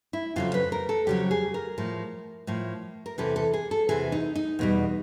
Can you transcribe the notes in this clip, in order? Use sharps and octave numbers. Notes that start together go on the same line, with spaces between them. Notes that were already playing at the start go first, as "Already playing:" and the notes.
E4
F2 C#3 F#3 F4
B4
A#4
A4
F2 C#3 F#3 G4
G#4
A#4
A2 F3
A2 F3
A#4
E2 C3 E3 A4
A4
G#4
A4
E2 C3 E3 G#4
D#4
D#4
E2 B2 G3